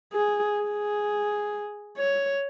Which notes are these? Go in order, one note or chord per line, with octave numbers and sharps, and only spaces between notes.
G#4
G#4
C#5